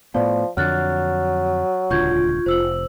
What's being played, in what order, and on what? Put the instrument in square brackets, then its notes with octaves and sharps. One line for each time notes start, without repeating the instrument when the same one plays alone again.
[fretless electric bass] A2 B3 [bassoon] F3 [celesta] D5
[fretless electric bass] F2 D3 [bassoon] F#3 [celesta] F6 F#6 A6
[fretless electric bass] D#1 C#2 D3 [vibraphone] F4 [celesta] C#6 G6 G#6
[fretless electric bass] F1 [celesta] C5 E6 F#7